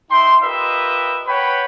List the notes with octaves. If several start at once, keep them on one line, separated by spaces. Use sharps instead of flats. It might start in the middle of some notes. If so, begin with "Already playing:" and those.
D#4 E5 G5 C6
F4 G4 A#4 B4 D#5 E5
B4 C#5 F#5 G5 B5